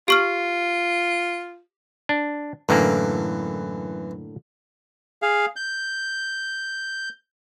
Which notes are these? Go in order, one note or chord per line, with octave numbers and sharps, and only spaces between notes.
F4 G4 C#6 F6
D4
F#2 A2 D3 E3 A#3
G#4 F5
G6